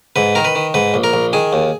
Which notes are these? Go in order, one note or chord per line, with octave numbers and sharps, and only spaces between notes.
G#2 B4
D#3 A#4
B4
D#3
G#2 B4
A#1
A#4
A#1
D#3 G#4
D#2